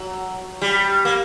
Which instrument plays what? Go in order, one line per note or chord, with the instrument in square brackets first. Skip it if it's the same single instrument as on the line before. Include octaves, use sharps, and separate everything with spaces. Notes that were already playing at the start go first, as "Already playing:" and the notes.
Already playing: [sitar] F#3
G3
A#3